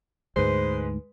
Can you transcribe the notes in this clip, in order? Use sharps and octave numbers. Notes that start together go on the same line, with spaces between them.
D2 G#2 G#3 B4 C5